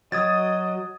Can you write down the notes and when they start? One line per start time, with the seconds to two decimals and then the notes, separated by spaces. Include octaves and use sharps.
0.12 F#3 D#5 D#6 G#6 A6